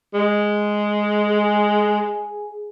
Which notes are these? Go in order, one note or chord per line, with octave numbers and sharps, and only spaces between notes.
G#3
G#4